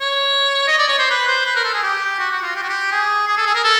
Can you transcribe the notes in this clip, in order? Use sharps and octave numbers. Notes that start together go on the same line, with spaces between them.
C#5
D#5
D5
C#5
C5
B4
C5
B4
A#4
A4
G#4
G4
F#4
F#4
F4
G4
F#4
G4
G#4
G#4
A4
G#4
A#4
A4